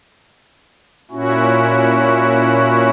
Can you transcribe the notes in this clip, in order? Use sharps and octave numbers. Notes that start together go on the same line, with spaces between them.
A#2 C#4 E4 F#4